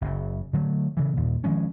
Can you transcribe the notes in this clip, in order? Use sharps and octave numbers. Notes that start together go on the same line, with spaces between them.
F#1 F#2 C#3
D3 F#3 G#3 A3
C#3 E3
D#2 A#2
D#3 F3 G#3 C#4